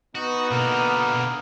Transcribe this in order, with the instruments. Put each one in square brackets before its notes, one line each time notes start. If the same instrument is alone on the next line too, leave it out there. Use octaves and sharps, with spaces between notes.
[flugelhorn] B3 [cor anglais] D#4 [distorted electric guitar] F#4
[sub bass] B2 [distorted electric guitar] D3 D#4 [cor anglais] A#3